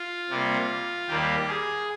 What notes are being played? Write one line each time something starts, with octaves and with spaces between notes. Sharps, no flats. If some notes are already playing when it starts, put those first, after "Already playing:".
Already playing: F4
C3 G3 A#3
D#2 D#3 G3 A#3 G4
G#4